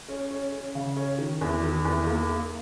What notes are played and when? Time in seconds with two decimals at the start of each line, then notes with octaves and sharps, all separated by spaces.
0.08 C#4
0.31 C#4
0.52 C#4
0.75 C#3
0.97 C#4
1.18 D#3
1.41 E2
1.63 D#3
1.85 E2
2.07 A#3
2.29 A#3